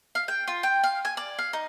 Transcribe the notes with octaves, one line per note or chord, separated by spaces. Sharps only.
F5
G5
F4
G5
F5
G#5
D5
F5
D#4